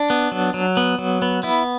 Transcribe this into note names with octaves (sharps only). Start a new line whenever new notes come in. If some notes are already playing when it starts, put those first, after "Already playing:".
Already playing: D4
B3
F#3
F#3
B3
F#3
B3
B3 E4